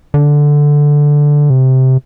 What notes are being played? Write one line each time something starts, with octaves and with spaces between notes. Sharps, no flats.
D3
C3